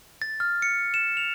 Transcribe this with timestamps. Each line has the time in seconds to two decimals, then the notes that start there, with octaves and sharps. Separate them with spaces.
0.22 A6
0.40 F6
0.62 C#7
0.94 E7
1.17 F7